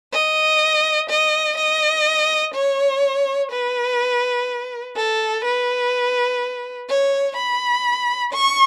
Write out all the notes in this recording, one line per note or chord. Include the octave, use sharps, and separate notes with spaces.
D#5
D#5
D#5
C#5
B4
A4
B4
C#5
B5
C#6